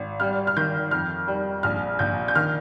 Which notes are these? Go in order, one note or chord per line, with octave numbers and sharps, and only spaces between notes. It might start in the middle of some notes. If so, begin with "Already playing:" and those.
Already playing: G#1
G3 F6
F6
D#3 G6
F2 F6
G3
A#1 F6
A#1 G6
G6
D#3 F6